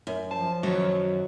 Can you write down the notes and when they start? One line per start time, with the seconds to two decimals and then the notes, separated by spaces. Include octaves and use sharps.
0.07 F#2
0.31 F3 C5 A5
0.63 F#2 D#3 F#3 C#5